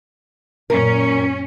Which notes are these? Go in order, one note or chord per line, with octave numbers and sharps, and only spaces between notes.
F#2 A#2 C#4 A#4